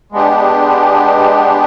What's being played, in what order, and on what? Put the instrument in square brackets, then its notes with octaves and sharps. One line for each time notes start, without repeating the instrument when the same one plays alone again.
[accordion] G#3 B3 D4 G4